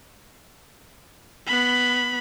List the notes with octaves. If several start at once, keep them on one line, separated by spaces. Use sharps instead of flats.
B3 B5